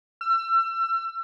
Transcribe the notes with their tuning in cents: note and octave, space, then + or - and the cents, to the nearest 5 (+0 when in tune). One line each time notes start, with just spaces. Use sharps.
E6 +35